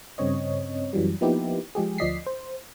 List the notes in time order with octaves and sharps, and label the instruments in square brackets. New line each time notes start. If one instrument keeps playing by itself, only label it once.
[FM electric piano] G2 C#3 C4 C#5 D#5
F#2 E3 F#3 G3
F3 A#3 B3 D#4 E4 G4
F3 G#3 G4 G#4
D2 F3 D5 D#5 B6 C7
C5